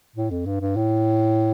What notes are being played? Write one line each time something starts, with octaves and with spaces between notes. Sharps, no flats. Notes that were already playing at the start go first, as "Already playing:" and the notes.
A2
F2
G2
G2
A2